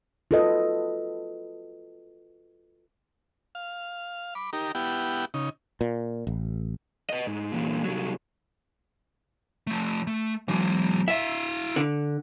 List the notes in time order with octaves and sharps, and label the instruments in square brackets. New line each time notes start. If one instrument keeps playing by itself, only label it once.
[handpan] F4 F#4 A4 B4 D#5
[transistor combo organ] F5
B5 D6
D#4 G4 A#4
B3 E4 G4 F#5 G5
C#3 D#4
[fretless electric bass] A#2
A1
[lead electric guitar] B4 D#5
G#2
E2 A#2
C2 F#3
F3 A3
A3
[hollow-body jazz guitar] B1 [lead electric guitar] E3 G#3
[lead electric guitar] E4 F5 [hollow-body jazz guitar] E5
[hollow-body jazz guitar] D3